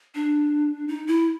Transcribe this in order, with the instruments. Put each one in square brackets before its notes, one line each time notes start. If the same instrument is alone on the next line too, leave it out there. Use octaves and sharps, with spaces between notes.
[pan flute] D4
D#4
E4